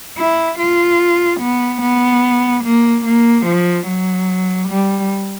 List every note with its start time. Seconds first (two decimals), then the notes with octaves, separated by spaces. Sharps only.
0.18 E4
0.59 F4
1.40 B3
1.81 B3
2.64 A#3
3.05 A#3
3.46 F3
3.87 F#3
4.68 G3